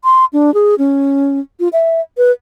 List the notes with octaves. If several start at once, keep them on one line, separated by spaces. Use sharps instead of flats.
C6
D4
G#4
C#4
F4
E5
B4